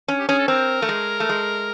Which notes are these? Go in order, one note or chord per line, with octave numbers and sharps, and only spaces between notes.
C#4
G4
C#4 G#4
A4
C4 A#4
A3
G#3
A3
G#3